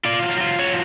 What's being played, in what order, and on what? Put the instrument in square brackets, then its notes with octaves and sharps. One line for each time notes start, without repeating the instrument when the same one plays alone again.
[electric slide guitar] F4 D5
F#3 F5
F4
F#3 C#5